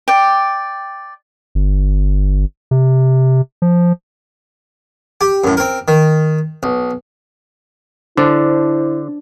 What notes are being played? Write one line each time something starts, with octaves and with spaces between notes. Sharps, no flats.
D5 G5
G1
C3
F3
G4
F#2 A2
C4 A#4
D#3
B1
D3 D4 E4 C5